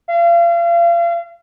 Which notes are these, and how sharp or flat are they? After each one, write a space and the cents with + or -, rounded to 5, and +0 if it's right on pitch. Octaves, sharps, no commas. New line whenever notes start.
F5 -35